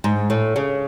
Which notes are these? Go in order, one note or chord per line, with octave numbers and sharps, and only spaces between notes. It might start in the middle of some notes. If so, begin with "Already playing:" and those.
G#2
A2
C#3